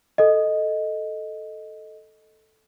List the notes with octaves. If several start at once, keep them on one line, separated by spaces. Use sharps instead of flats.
A4 D#5